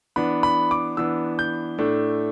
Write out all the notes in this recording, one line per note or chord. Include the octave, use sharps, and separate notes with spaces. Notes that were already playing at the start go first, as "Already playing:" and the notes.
E3 B3 D4 B5
B5
D6
E3 B3 D4 E6
G6
A2 A3 D4